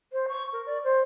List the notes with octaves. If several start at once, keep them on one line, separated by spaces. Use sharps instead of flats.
C5
C#6
A#4
D5
C5